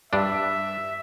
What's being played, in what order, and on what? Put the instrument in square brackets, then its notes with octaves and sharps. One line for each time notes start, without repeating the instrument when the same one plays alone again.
[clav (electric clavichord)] G2 D4 [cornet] E5